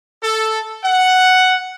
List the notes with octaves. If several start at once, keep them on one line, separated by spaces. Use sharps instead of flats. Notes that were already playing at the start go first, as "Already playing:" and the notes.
A4
F#5